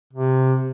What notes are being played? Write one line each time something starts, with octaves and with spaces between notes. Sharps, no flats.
C3